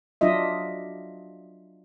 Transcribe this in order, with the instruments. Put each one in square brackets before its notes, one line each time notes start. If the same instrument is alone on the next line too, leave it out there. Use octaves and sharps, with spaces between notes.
[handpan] F#3 D4 F4 D#5 E5